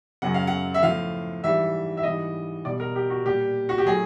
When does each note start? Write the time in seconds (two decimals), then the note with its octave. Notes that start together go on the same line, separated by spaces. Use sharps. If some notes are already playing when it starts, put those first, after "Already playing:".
0.22 F#2 C#3 F#3 F#5
0.34 F5
0.47 F#5
0.74 E5
0.83 A2 F3 F5
1.43 G#2 E3 G3 E5
1.97 E5
2.03 G#2 E3 G3 D#5
2.65 B2 G3 D5
2.80 A#4
2.96 G4
3.10 F#4
3.25 A#2 G3 G4
3.69 F#4
3.78 G4
3.86 A2 F#3 G#4